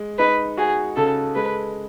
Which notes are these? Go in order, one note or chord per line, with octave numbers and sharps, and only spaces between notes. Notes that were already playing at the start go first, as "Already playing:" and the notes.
Already playing: G#3
D#4 B4
F#4 G#4
C#3 A4
G#3 B4